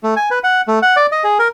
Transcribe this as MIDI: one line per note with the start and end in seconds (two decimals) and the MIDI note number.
0.03 0.14 57
0.16 0.29 80
0.31 0.39 71
0.44 0.61 78
0.68 0.79 57
0.82 0.96 78
0.96 1.06 74
1.12 1.24 75
1.24 1.38 68
1.39 1.48 70